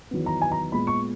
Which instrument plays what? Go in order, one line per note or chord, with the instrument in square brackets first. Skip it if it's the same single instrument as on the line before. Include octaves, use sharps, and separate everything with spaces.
[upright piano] E2 D#3 F#3 B3
A#5
G#5
A#5
A#2 G#3 B3 B5
C#6